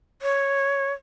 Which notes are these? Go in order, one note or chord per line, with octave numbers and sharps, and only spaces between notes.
C#5